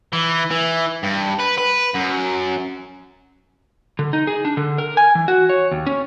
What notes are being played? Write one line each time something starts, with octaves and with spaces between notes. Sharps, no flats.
E3
E3
G2
B4
B4
F#2
D3
D#4
G#4
D4
D3
A#4
G#5
E3
F#4
C#5
D#2
C#4